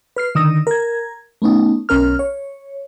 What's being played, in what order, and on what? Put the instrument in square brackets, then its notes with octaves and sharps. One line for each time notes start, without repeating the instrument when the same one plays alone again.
[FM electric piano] B4 F6 C7
D3 D#3 D#6 E6 A#6
A#4 G#6
A3 B3 C#4 D#4
B1 C#4 A#4 F6
C#5